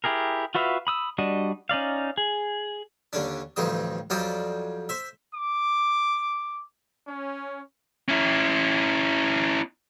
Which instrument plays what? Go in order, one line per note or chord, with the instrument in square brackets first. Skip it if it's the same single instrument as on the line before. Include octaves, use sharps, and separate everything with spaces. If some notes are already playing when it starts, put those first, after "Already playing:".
[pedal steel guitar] E4 G4 G#4 A#4
F4 F#4 B4 E5 F5
B5 D#6 E6
G3 D4 F#4 D#5
C#4 D#4 D5 F5
G#4
[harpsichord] D#2 D3 C#4 D4
A1 D2 G2 F3 C4 D#6
F2 F#3 G3 F4 D5 D#5
C5 E5
[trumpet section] D6
C#4
[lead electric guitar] C#4 E4